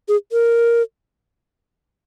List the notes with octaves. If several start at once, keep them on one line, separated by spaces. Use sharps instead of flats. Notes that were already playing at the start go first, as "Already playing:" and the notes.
G#4
A#4